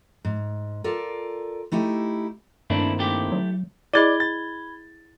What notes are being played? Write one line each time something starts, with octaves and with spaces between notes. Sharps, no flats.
G#2
F4 A4 A#4 D5
A3 D#4 E4 G4
G2 D#3 A3 A#3 C4 D4 E4
A3 E4 G4
F#3
E4 G#4 D5 D#5 B5 G#6 A6 G7
A6